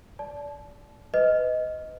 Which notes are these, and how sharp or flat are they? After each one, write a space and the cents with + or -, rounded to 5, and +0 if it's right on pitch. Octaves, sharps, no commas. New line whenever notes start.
D5 -25 A5 -25
B4 +30 D#5 +10